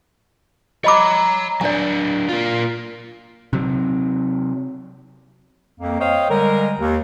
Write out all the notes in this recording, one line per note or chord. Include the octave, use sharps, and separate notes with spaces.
C#5 D#5 A#5 B5 D6
F#3 D4 D5 G#5
A#3 F4
C3 F#3
F2 A#3
C5 C#5 D#5 F5 G5
D3 G3 G#3 A#4
D#2